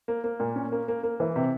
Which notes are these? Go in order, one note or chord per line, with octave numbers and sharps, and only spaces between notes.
A#3
A#3
A#2
C#4
A#3
A#3
A#3
E3
C3